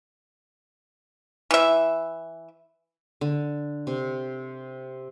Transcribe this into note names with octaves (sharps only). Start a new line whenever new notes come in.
E3 E5
D3
C3